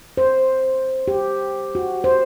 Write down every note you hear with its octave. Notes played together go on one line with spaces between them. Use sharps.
C5
G4
F#4
C5